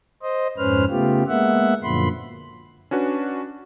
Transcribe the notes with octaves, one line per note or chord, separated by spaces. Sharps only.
C5 D#5
F2 G#2 C#4 B4 C5 F6
C#3 A3 B3 F4 G4
G#3 A#3 B3 E5 F#5
F#2 A#2 D3 F3 B5 C6
C#4 D4 F#4 B4